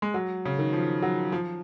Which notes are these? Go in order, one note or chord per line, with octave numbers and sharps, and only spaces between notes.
G#3
F#3
C#3
D#3
F3
F#3
F3